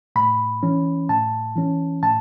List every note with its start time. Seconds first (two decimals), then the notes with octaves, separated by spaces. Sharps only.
0.16 A2 B5
0.63 E3 C#4
1.09 A2 A5
1.56 E3 C#4
2.03 A2 A5